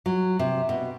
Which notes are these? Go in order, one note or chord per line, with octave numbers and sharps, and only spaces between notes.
F#3
C3
B2